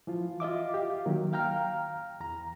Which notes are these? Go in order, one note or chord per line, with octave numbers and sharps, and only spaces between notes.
E3 F3 F4
F4 D#5 E5 D6
G4 F5
D#3 F#3 A#3
F5 G5 A#5 F6
E2 A#5